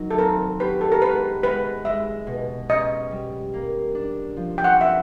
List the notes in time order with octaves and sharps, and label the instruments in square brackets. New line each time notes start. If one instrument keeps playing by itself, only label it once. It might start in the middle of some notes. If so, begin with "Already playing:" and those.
Already playing: [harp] D#3 F#3
[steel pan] A4
[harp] C4 [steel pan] A#4
[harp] G4 [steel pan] B4
[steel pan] A4
A#4
[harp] G#3 [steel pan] B4
[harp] G#3 [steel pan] B4
[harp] G#3 [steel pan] E5
[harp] B2
[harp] C#4 [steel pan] D#5
[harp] G3
A#3
D4
F3
[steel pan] G5
F#5
[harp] C4 [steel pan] E5